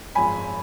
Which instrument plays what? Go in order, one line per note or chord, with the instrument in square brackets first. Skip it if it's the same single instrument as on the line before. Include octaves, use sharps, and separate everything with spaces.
[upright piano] G#1 F#2 F3 G#3 G#5 B5